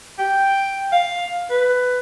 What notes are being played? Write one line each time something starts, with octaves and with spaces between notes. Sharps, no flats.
G5
F5
B4